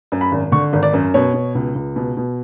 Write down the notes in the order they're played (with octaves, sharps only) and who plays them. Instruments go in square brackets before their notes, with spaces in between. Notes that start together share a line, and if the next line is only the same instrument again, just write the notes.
[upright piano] F#2
B5
G#1
D3 C#6
G#1
D5
F#2
B2 C#5
B2
C#2
C#2
B2
B2